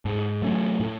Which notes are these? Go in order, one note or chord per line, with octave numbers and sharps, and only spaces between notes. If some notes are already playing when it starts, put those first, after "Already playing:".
G#2
F#3 A3 C#4
A2